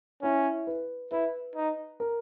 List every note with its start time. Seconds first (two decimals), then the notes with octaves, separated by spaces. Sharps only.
0.22 C#4 E4
0.67 B4
1.12 E4 B4
1.56 D#4
2.00 A#4